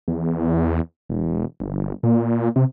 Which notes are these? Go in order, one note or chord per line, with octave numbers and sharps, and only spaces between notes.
E2
E1
G1
A#2
C3